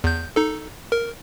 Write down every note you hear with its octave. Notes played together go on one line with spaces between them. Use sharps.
E2 G6
D#4 A4
A#4